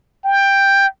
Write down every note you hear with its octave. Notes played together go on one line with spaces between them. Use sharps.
G5